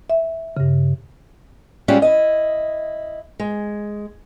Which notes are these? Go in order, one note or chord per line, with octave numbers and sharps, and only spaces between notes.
E5
G2 C#3
G3 G#3 C#4 F4 E5 F#5
E4 D#5
G#3